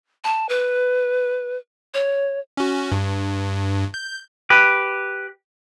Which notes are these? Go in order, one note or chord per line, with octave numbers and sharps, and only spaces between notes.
A5
B4
C#5
C#4 F#4
G2
G6
G4 B4